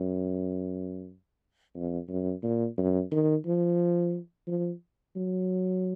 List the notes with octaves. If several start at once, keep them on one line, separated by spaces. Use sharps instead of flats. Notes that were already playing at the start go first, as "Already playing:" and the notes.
Already playing: F#2
F2
F#2
A#2
F#2
D#3
F3
F3
F#3